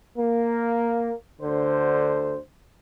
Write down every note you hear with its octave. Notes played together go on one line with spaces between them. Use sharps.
A#3
D2 D3 C5